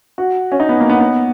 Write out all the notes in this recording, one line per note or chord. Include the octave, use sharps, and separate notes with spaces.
F#4
C#4
D#4
B3
A#3
B3
B3